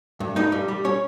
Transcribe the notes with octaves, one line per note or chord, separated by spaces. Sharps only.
G2
G2 D#4 D#5
G3
G3
C#4 C#5